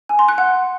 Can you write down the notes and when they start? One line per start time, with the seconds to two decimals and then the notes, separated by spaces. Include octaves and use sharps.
0.09 G#5
0.19 C6
0.28 F#6
0.38 F#5